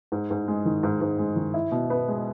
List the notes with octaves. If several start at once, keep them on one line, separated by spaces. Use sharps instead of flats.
G#2
G#2
G#3
D#3
G#2
G#2
G#3
D#3
E4
B2
B3
G#3